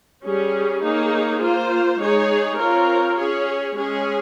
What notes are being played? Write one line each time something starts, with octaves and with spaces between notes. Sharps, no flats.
G3 C#4 G#4
A#3 D#4 G#4 C#5
A#3 F4 C5
G#3 D#4 G#4 C#5
C4 F4 A#4 C#5
C#4 G#4 C#5
G#3 C#4 G#4